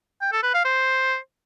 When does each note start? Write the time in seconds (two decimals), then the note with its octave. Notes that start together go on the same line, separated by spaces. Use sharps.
0.21 G5
0.32 A4
0.43 B4
0.54 F5
0.65 C5